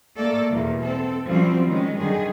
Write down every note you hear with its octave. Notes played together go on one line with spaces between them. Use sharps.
A3 A#3 A4 D5
E2 B2 G3 A#3
C4 A4
F#2 F3 G3 C4
D#3 G#3 C#4
F#2 D3 D#3 G3 G#4